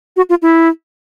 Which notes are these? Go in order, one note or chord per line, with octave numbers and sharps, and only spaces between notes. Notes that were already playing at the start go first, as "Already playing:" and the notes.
F#4
F4
E4